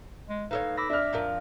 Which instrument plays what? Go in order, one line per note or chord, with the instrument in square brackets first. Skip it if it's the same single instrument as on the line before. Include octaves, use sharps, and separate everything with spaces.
[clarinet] G#3
[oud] D#4 A4 C#5 [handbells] B4 [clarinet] F5
[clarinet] B5 [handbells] D6 E6 A#6
[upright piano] D4 F6 [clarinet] E5
[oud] F2 F3 A#4